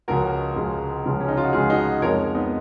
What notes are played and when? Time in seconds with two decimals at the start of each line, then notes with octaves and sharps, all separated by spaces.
0.08 C#2 C#3 F3 G#3 F#4 A#4
0.56 C#2 C#3 F3 G#3
1.05 C#2 C#3 F3 G#3
1.20 C#4
1.29 D#4
1.37 F4
1.45 F#4
1.53 C#2 C#3 F3 G#3 F4 G#4
1.70 D#4 F#4
2.01 F2 F3 G#3 A#4 C#5
2.35 B3 D#4